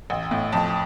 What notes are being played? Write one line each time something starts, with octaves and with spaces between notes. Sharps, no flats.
A1
A2
F2 A5